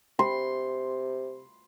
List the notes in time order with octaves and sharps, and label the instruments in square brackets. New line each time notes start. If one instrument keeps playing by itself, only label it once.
[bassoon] C3 [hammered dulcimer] C6